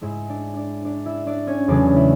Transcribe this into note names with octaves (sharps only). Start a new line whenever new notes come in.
G#2 G#3 E4 E5
D4 D5
D4 D5
D4 D5
E4 E5
D4 D5
C#4 C#5
E2 C#3 F#3 A3 D4 D5
E4 E5